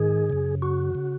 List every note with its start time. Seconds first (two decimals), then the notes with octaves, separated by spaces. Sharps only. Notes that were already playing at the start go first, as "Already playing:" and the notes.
Already playing: G#2 D#3 G#4
0.30 F#2 C#3
0.62 F#4
0.95 C#3